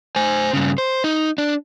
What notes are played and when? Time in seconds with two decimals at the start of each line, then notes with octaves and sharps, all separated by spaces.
0.16 C5 G#5
0.53 G2 C#3
0.78 C5
1.04 D#4
1.38 D4